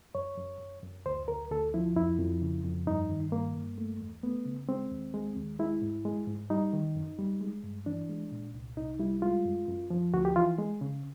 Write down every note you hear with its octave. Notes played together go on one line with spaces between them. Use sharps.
F#2 C#5
F#2
F#2
F#2
D2 C5
D2 A#4
D2 A4
F3 E4
F2 E4
F2
C#3
F2
G2 D#4
D#3
G2 A#3
G2
A3
E2
A3 B3
C#3
G#3 C4
D#2
G#3
D#2
G#3 E4
G#2
G#3
G#2
G3 D#4
D#3
F#2
G3
G#3
G2
E3 D4
G#3
A#2
C2
C2 D#4
G3 E4
G#3 F4
F#2
F#2
F3
D2 F#4
G4
E3 F4
G#3
C#3